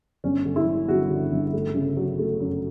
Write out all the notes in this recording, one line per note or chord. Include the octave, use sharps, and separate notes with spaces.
G1 C#4
D3
E4
D3
G1 F#4
D3
G1
A3
C#3
F#3
A3
F#2